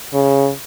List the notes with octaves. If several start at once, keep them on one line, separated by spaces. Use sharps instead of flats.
C#3